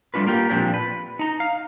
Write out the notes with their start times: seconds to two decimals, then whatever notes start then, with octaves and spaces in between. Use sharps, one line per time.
0.14 G3 A3 D4 F4 B4
0.27 A#3 F4 G4
0.49 A#2 F3 C4 D4 G4
0.74 B4
1.19 D#4 A#5
1.40 F5